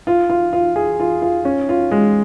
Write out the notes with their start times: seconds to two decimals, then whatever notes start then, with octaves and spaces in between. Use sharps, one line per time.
0.07 F4
0.30 F4
0.53 F4
0.76 G#4
1.00 F4
1.22 F4
1.45 C#4
1.69 F4
1.91 G#3